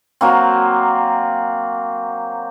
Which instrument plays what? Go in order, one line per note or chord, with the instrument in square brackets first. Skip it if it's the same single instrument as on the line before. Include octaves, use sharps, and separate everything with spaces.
[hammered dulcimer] F#3 A#3 C4